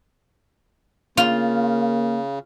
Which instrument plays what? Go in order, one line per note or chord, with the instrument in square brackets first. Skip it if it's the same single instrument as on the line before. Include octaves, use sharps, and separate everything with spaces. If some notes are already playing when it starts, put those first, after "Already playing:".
[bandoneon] C#3 [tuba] A#3 [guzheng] F4